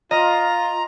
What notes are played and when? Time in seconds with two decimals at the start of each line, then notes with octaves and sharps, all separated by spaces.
0.11 F4 D#5 A#5